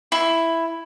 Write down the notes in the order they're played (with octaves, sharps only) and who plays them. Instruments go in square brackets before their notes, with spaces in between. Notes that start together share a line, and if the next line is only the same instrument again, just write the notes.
[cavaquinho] E4